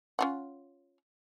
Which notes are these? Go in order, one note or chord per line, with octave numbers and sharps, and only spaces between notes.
C#4 F4 F#5